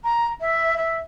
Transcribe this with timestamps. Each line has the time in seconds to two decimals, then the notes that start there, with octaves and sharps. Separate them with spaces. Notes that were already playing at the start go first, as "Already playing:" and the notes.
0.04 A#5
0.41 E5
0.77 E5